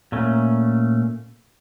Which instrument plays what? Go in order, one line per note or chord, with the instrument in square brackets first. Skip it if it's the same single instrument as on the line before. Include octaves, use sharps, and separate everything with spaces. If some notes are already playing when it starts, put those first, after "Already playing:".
[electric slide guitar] A#2 A3 C#4